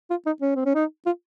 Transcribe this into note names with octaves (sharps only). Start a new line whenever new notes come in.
F4
D#4
C#4
C4
C#4
D#4
F4